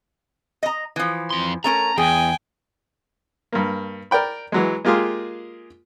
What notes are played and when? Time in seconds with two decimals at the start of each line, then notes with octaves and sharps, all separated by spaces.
0.63 D#5 A#5
0.96 E3 F3
1.30 F2 C6
1.64 A3 C#4 A#4 A#5
1.98 E2 G#4 G5 G#5
3.52 G2 A#3
4.11 A#4 D5 G5 B5
4.52 E3 F#3 G#3
4.85 G#3 A#3 F4 G4 G#4